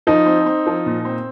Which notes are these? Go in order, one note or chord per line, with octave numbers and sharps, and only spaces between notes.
F3 D#4
C4
C4
F3
A#2
C4